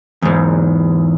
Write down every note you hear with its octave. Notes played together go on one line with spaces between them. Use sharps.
E2 G#2